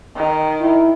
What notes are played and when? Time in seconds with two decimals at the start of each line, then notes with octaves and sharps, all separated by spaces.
0.16 D#3
0.61 E4